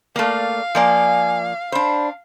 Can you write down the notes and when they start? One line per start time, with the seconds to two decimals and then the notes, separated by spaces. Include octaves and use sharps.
0.16 A3 A#3 D5 F5
0.75 F3 A#3 D5 G#5
1.72 D4 C5 B5